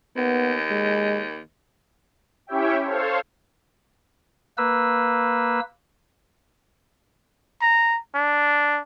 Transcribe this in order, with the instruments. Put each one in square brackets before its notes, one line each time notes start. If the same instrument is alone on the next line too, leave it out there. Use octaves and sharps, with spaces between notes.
[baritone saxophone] D#2 [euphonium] B3
[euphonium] G#3
[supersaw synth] C#4 E4 G4 C#5 E5 G5
A4 C5 C#5 F5
[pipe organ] A#3 B4 E6
[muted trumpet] A#5
D4